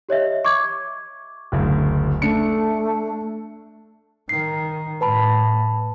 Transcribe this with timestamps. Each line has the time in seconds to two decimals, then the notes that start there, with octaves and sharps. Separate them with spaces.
0.09 G4 C#5 D#5 E5
0.45 C#6 D6 G#6
1.52 F#1 D2
2.22 A3 D4 C#7
4.29 D#3 C7
5.01 A2 B4 A5 B5